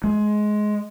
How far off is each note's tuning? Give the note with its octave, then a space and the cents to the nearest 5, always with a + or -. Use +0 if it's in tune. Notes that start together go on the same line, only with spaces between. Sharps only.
G#3 +15